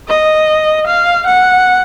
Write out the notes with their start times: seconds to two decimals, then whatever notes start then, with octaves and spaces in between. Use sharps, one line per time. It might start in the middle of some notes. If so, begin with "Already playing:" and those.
0.08 D#5
0.87 F5
1.27 F#5